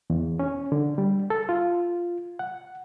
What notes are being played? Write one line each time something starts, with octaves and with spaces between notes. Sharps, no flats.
E2
C#4
D3
G3
A4
F4
F#5